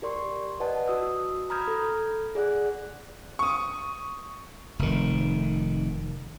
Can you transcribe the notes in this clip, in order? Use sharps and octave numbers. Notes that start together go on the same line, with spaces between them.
G4 A#4 D5 C6 C#6
B4 D5 D#5 F#5 A5
F#4 D#6 E6
A#5 B5 D#6 F6 G6 G#6
A4
G#4 D5 F#5 F#6
C#6 D#6
F1 D#3